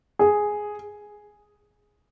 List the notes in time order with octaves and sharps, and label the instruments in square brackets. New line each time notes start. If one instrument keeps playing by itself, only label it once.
[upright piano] G#4